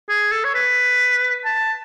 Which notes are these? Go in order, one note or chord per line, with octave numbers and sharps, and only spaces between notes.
G#4
A4
C#5
B4
A5